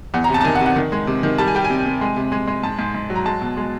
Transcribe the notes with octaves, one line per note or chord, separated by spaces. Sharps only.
E2 F#5
A#5
C3 A5
A5
D#3 G#5
F#5
C3
F#5
D#3
G#3
C3
D#3
G3 A5
G#5
G3 G5
G#5
C3
C3
G#3
C3
G#3
G#3
G#2 A5
G#2
G#2
F#3
A#5
G#3 A5
B2
G#3